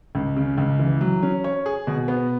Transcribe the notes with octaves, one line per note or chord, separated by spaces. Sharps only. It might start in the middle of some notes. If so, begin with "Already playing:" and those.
C#2
C#3
C#2
E3
F#3
C#4
C#5
G#4
B2
B3